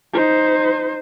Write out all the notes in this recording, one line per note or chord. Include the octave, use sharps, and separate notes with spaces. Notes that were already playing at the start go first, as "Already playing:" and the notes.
D#4 C5